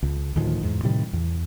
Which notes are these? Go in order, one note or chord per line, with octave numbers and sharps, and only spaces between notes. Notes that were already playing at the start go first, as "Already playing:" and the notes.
C#2
D2 A2 D#3 F3
E2 G#2
A2 C3 D#3 G3
E2